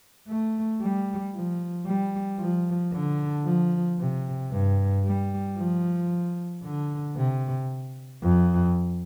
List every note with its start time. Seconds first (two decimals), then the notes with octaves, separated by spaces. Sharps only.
0.29 A3
0.82 G3
1.35 F3
1.87 G3
2.40 F3
2.93 D3
3.46 F3
3.99 C3
4.52 G2
5.06 G3
5.58 F3
6.64 D3
7.17 C3
8.23 F2